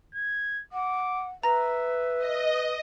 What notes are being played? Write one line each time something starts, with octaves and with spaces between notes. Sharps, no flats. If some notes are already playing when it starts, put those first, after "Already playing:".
G#6
F#5 D6
B4 E5 A#5 A#6
D#5